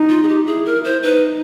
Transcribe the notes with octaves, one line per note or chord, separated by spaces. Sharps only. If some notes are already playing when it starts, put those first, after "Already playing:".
Already playing: D#4
F4
G#4
G4
E4 G#4
A#4
C5
D#4 B4